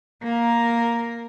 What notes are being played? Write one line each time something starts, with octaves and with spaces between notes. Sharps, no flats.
A#3 A#4